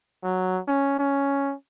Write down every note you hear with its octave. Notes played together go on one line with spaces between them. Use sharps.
F#3
C#4
C#4